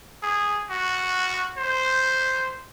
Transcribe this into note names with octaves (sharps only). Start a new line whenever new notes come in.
G#4
F#4
C5